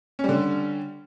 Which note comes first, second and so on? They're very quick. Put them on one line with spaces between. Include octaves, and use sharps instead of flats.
C#4 G3 D3